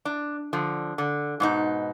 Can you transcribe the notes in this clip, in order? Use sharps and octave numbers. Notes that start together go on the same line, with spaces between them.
D4
D3 F3
D3
G#2 B2 D#4